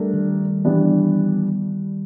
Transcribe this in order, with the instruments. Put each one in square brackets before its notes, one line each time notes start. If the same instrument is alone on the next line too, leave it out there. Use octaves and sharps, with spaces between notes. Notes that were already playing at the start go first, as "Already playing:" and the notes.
Already playing: [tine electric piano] G3 [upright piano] A3 D4 G4 A#4
[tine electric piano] D#3
[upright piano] E3 G3 B3 D4